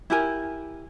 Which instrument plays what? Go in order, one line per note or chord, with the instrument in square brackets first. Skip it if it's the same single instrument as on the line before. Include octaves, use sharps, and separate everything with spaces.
[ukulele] E4 G4 A#4 G#5